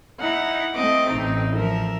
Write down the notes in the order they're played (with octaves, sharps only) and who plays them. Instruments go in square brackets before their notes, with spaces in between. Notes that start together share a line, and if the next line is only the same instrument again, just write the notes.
[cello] D#4 E4 [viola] F#5
[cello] A3 C4 [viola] D#5 D6
[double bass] A1 [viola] D#4
[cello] F3 [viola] A#4 E5